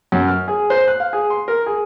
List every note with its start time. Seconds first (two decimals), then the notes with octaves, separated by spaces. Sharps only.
0.12 F#2
0.28 F6
0.48 G#4
0.70 C5
0.88 F#6
1.00 F5
1.13 G#4
1.30 C6
1.48 A#4
1.66 G#4